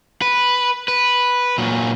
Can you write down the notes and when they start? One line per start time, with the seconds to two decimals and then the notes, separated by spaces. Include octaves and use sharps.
0.22 B4
0.88 B4
1.58 A#2 F#3